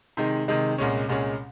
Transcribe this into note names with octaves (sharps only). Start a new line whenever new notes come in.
C3 D#3 G#3 D#4
C3 D#3 G#3 D#4
C2 A#2 G#3 C#4
C2 A#2 G#3 C#4